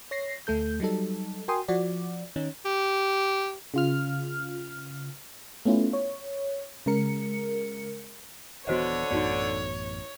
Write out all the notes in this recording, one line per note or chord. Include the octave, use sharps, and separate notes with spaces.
C#5 A#6 C7
D2 A3 A4 G6
F#3 G3 D#4 A4
F#4 A#4 G5 G#5 C6 D#6
F3 F#4 D5
D#3 C#4 D#4
G4
C#3 F4 F6
A3 B3 C#4 E4 F4
C#5
C#3 G#3 A#4 C#7
D#1 D3 E3 B3 F#4 C5 C#5 D#5
A1 F#2 B3 D#4 F#4 D5